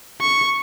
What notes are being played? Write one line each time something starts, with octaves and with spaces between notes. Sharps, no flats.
C#6